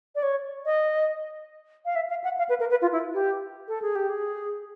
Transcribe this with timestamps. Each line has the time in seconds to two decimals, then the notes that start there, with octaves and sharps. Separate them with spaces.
0.15 D5
0.23 C#5
0.66 D#5
1.85 F5
1.96 E5
2.09 F5
2.24 F#5
2.38 F5
2.49 B4
2.60 A#4
2.70 B4
2.82 F4
2.92 E4
3.14 G4
3.68 A4
3.82 G#4
3.95 G4
4.09 G#4